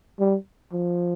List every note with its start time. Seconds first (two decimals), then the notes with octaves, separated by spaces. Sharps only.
0.19 G3
0.73 F3